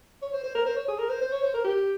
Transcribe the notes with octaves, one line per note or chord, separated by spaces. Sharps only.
C#5
C5
C5
A#4
C5
C#5
G#4
A#4
C5
C5
C#5
C5
A#4
G4